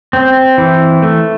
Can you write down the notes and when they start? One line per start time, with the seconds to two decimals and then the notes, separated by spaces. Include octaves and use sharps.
0.13 C4
0.58 E3
1.02 A3